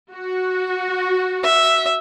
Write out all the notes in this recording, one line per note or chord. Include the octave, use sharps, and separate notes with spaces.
F#4
E5